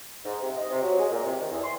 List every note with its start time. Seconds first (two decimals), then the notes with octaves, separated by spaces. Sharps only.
0.25 G#2
0.41 C3
0.57 D#5
0.70 C3
0.82 F#3
0.99 G#3
1.11 A#2
1.24 C3
1.38 D#3
1.51 E2
1.64 C6